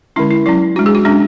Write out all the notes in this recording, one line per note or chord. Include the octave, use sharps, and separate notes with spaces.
D3 G#3 C#4 E4
E4
F#3 C#4 E4
G#3 D4 F#4
G#4
F#4
G#3 C#4 D4